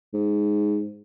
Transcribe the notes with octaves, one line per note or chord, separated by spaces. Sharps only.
G#2